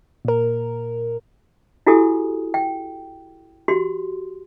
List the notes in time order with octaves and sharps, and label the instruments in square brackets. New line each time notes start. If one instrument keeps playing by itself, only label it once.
[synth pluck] A#2 A#4
[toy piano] E4 F#4 G4 A4 G#5 D#6
G5
F#4 G4 C6